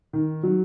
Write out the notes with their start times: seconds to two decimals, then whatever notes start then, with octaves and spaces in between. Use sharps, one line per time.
0.13 D#3
0.43 F#3